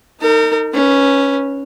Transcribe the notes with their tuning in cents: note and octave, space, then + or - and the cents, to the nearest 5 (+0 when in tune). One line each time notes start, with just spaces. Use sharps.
D#4 +0 A#4 -40
C#4 +0 B4 -15